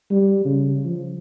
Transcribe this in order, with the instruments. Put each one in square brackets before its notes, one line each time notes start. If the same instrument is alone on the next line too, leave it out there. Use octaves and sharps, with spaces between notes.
[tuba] G3
C#3
F3